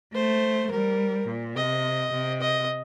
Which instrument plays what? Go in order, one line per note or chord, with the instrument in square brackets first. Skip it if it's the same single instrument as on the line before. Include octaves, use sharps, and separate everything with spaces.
[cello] A3 [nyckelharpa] C5
[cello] G3 [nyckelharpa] A#4
[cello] A#2
[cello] C3 [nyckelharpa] D#5
[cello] C3
[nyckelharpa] D#5